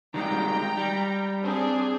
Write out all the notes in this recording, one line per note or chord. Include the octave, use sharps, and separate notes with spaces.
D#3 G3 G#3 G5 A#5
G3
C4 D4 G#4